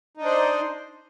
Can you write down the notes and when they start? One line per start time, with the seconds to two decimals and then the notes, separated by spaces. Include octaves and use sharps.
0.17 D#4
0.21 D4
0.25 C5